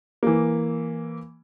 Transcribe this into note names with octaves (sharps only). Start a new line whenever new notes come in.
E3 A#3